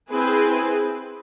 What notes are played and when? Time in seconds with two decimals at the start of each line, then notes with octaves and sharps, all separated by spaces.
0.10 C4 E4 G#4 B4